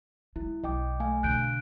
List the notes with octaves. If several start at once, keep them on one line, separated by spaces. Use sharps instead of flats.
G#3 E4
B1 D#5 G5 D6
A3 F5 G#5
B2 D3 F#6 G6 D7